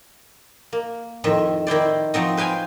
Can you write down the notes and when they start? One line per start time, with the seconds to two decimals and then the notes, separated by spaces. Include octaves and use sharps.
0.73 A#3
1.24 F2 A2 D#3 E5
1.67 D#3 E4 C5 D5
2.14 F3 F#3 C4 D#4
2.37 B4 C5 F5 G5 G#5